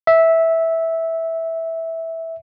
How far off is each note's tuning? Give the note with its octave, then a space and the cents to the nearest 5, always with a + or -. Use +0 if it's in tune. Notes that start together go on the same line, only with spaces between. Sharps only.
E5 -10